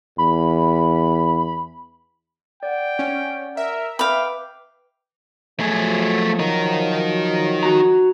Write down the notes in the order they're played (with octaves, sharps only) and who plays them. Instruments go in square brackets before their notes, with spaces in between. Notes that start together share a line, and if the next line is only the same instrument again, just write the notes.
[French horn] E2 [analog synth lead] B5
[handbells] D5 F#5 [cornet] G5
[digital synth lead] C#4
[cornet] A#4 [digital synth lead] E5
[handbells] B4 D6 [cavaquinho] F5 B5 [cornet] G5
[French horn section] F3 F#3 [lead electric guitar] A3 G#4
[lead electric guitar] D#4 A#4
[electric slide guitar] F#4 A#5